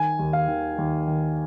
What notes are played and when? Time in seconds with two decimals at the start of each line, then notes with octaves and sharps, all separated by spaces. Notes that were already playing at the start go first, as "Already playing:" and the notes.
Already playing: D#3 G#5
0.19 D#2
0.33 F5
0.48 D#3
0.78 D#2
1.07 D#3